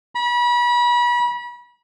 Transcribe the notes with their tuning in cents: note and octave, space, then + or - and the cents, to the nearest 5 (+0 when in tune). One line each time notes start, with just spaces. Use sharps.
B5 -35